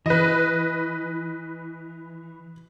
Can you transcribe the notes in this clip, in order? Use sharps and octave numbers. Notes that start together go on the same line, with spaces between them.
E3 B4 D#5